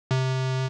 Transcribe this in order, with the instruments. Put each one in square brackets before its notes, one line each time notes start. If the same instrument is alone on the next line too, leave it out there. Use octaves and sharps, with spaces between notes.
[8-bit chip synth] C3